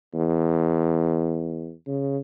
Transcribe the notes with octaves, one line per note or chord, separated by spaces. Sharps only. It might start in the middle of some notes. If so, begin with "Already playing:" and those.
E2
C#3